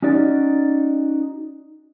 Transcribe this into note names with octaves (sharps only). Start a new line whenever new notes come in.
C#4 D#4 F#4 D5